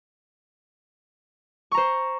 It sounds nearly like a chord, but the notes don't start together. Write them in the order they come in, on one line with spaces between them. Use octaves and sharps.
C#6 A#5 C5